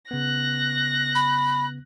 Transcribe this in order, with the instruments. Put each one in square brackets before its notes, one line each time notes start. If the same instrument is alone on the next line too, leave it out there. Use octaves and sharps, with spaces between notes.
[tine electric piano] C#3 B3 [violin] F#6 A#6
[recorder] B5